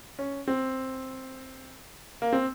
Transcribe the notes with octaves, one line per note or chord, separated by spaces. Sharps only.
C#4
C4
A#3
C4